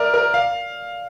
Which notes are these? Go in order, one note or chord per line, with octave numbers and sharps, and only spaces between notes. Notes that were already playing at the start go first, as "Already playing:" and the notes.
Already playing: A#4 D5 E5
A#4
F5